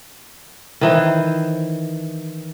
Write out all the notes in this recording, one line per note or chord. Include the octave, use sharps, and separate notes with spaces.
D#3 E3 C5